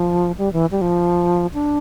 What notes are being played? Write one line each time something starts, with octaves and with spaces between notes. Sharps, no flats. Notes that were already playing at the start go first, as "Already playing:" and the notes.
Already playing: F3
G3
E3
G3
F3
D4